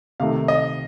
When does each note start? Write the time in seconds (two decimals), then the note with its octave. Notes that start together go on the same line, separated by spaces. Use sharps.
0.20 C3 D#3 A3 F5
0.48 D#5